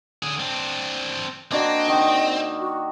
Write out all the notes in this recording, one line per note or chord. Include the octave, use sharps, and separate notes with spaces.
D3 G#4
C4 D4
A#3 C4 D4 F#4 D#5
D#3
F#4